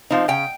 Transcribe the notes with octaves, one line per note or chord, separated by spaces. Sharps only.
F3 C4 D#4
C#3 G5